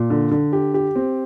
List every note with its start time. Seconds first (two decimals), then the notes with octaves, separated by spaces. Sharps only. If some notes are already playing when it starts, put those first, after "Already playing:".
Already playing: A#2
0.10 D3
0.31 D3
0.53 G4
0.74 G4
0.95 C4